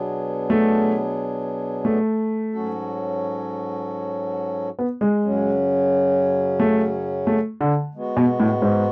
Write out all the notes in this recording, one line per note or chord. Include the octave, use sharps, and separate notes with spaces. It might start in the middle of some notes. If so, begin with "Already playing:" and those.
Already playing: B2 F#3 B3 D4 G#4
A3
A3
G#2 F#3 C#4 F#4 A4
B3
G#3
F#2 C#3 F#3 C#4
A3
A3
D3
G#3 B3 F#4
B2
A2
G#2